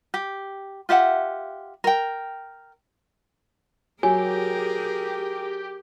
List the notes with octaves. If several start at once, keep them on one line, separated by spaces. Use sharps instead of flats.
G4
F4 G4 E5 F#5
A#4 G5
F#3 G4 G#4 A#4 G#5